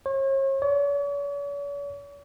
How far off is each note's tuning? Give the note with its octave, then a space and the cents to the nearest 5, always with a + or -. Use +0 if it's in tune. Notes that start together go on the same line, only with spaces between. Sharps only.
C#5 -40
C#5 +45